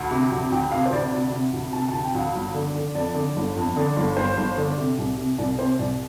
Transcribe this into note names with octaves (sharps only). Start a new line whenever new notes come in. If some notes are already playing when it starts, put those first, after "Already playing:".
Already playing: D2
C3
D2
D2 G5
C3 F5
C5
D2 D5
C3 D5
C3
D2
C3 A5
A5
D2
G5
D2 F5
G1
D3
D3
F2 D5
D3
G1
F2
D3
G1
G1 C5
G1
D3
C3
C2
C3
C2 D5
C3 C5
C2 D5